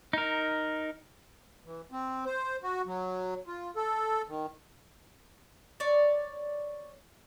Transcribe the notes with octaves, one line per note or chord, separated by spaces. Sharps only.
D#4 A#4
E3
C4
C5
F#4
F#3
F4
A4
D#3
C#5 D5